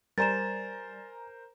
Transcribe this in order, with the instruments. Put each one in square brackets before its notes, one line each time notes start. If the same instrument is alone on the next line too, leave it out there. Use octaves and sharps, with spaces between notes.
[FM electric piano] G3 D5 [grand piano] A#4 C5 [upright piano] G#5 A#5 [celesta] A6 E7